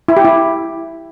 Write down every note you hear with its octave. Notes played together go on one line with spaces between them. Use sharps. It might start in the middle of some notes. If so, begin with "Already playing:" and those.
E4
G4
E4